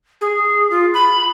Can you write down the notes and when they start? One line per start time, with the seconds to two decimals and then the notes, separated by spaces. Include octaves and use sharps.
0.21 G#4
0.71 F4
0.94 B5